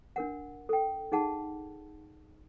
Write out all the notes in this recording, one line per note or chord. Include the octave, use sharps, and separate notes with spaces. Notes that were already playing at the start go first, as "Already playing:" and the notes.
D4 A#4 F#5
A4 G5
D#4 G#4 F#5 A5